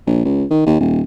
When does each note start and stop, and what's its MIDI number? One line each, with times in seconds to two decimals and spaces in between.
0.06 0.22 34
0.25 0.44 37
0.51 0.66 51
0.66 0.77 39
0.80 1.01 27